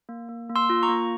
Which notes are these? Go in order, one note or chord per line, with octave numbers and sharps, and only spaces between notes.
A#3
A#3
A#3
C6 E6
F4
A#5 C#6
A#3